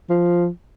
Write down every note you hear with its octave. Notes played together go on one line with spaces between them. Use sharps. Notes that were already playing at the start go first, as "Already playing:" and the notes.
F3